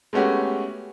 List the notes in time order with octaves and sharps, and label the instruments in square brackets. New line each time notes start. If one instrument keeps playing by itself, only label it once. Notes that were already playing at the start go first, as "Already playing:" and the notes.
[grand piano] G#3 A3 B3 C#4 F#4 G4